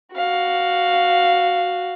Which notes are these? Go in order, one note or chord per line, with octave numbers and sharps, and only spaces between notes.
F#4 F5